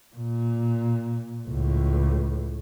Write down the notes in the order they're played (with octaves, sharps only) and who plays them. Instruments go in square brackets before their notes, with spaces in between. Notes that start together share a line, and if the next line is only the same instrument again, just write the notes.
[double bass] A#2
C#2 A2